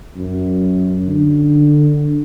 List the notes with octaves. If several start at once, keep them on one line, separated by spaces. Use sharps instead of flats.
F#2
D3